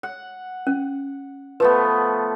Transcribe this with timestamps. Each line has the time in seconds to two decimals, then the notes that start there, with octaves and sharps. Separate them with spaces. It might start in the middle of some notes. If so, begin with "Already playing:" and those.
0.03 F#5
0.67 C#4
1.60 F3 A3 B3 B4